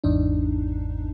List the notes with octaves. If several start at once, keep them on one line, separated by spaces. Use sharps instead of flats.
G#1 E2 G#2 D4 D#4